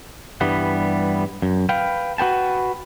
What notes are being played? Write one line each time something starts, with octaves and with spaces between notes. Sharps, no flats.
G2 E3 G3 B3
F#2
B4 F5 G5
F#4 B4 G5 A5